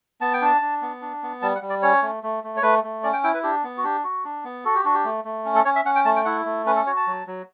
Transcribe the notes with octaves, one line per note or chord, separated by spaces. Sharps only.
B3 A5
G5
D4 A5
D4
B3
D4
B3
G3 A5
F#5
G3
D5
C#4 C#5
A3
A3
A3
C#5
A3 B4
A3
C#4 D5
G5
E4 G5
B4
D4 G4
B3
F#4
D4 G4
F#4
D4
B3
F#4 A4
G4
D4 F#4
G4
A3
A3
C#4
A4
C#4 C#5
E5
C#4 F#5
G5
A3 A5
G5
E4 F#5
A3
C#4 B4
A4
F#4 C#5
A5
F#3
F#3